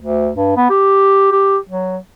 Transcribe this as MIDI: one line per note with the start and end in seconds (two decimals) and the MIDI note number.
0.02 0.29 38
0.35 0.52 43
0.57 0.68 59
0.70 1.31 67
1.32 1.57 67
1.69 1.97 54